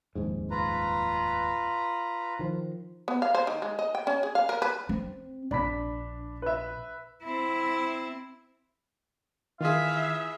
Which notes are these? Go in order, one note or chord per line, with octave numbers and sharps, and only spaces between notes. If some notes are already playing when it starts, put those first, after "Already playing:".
D#1 F2 G#2
F4 B4 A#5
D#3 F3
B3
F5
C5
D#3
G#3
D#5
G5
C#4
G#4
F5
A#4
B4
C4
A#1 D4 B5 B6
B4 E5
C4 E4
D#3 E3 F4 G#4 E5 F5